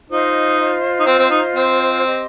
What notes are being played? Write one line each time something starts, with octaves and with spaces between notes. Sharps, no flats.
D#4 F4 C5 D#5
D#4
C4
C4
D#4
C4
G4 D#5 C6